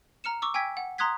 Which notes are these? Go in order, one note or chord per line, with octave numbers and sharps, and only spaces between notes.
A#5 F6 C#7 E7
C#6 D6 E6
G5 G#5 E6 G#6 B6
F#5
A#5 C6 D#6 F#6 G#6 B6